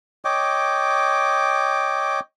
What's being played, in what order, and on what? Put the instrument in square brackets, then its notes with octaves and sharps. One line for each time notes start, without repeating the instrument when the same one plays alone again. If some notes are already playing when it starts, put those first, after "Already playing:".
[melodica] C#5 D#5 G5 D6